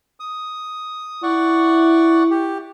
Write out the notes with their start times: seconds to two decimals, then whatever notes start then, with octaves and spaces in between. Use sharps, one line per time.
0.20 D#6
1.23 E4 D5 F#5 C#6
2.31 G4